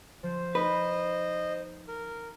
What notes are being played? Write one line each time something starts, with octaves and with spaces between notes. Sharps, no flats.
F3 C5
D#4 B4 D#5
A#4